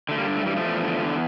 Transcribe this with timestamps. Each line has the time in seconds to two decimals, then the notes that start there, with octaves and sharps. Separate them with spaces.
0.09 D3 A3
0.18 G3 A#3
0.27 G2
0.37 A3
0.46 E3 G3
0.56 F3 A3
0.65 E2
0.84 D3
1.02 E2